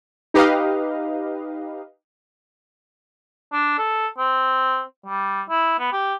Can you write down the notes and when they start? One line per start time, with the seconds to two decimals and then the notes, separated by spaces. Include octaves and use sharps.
0.34 D#4 G4 B4 D#5 F5
3.53 D4
3.78 A4
4.18 C4
5.06 G3
5.49 E4
5.79 B3
5.92 G4